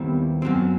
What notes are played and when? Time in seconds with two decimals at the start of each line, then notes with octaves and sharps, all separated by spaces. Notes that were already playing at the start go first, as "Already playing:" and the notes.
Already playing: D#2 D#3 G3 B3 C4 E4
0.42 F#2 F#3 C4